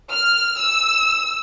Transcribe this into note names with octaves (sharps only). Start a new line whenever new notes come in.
F6
E6